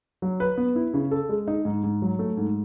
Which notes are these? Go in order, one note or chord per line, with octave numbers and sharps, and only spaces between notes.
F#3
B4
B3
E4
C#3
A4
G#3
D#4
G#2
G#2
F#3
A3
G#2